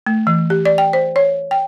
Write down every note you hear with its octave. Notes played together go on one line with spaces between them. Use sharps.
A3
E3
G4
D5
G5
C5
C#5
G5